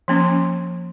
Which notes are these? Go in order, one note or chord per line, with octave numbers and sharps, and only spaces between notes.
F3 A#3 C#4